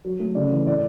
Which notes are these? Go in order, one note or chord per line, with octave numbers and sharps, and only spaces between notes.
F#3
A3
C#3 D5
E3
A2 D5